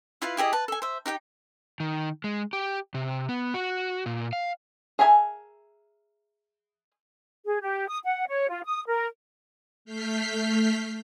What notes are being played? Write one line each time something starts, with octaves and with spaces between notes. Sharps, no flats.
E4 F4 B4 F5
E4 G4 G#4 D#5
B4 A5
A4 G#5
C5 E5
D#4 G4 F#5 G5
D#3
G#3
G4
C3
B3
F#4
A#2
F5
G#4 A#4 E5 G#5 A5
G#4
G4
D#6
F#5
C#5
F4
D#6
A#4
A3 F6 G6 B6 C7